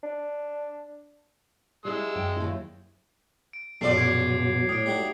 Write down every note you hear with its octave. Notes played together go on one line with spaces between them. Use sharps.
D4
G3 G#3 E4 E6
F#2 F#3 G5
D#2 B2 E4
D7
A#1 F#2 B2 F#3 A3 D5 C6 C7
D6 G#6 D7
A2 D#6 D7
G3 A3 D#4 F#4